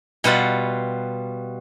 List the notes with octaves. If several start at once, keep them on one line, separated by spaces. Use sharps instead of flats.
B2 G3 F4 F#5